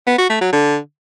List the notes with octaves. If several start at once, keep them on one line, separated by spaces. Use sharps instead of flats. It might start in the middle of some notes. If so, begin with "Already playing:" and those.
B3
F#4
A3
F#3
D3